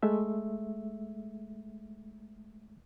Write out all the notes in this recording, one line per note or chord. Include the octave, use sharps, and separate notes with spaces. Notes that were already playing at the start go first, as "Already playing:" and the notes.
G#3 A3 E5